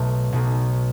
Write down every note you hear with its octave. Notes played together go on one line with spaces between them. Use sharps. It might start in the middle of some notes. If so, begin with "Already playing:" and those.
Already playing: B1 B2 A3
B1 B2